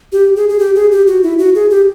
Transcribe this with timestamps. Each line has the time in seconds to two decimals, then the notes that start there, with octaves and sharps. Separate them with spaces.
0.12 G4
0.36 G#4
0.49 G#4
0.59 G4
0.76 G#4
0.92 G4
1.07 F#4
1.23 E4
1.39 F#4
1.55 G#4
1.70 G4